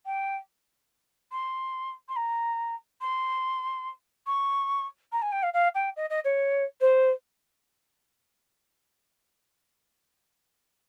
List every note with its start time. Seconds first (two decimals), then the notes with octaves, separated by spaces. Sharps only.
0.06 G5
1.32 C6
2.09 C6
2.16 A#5
3.01 C6
4.27 C#6
5.12 A#5
5.22 G#5
5.32 G5
5.43 F5
5.53 F5
5.75 G5
5.96 D#5
6.10 D#5
6.24 C#5
6.81 C5